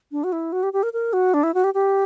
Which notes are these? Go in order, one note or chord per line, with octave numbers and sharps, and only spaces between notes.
D4
F#4
E4
F#4
G4
G4
A#4
A#4
F#4
D4
E4
F#4
G4
G4